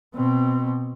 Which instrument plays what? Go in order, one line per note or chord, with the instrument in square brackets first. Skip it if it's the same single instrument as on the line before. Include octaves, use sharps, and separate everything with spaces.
[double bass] B2 C4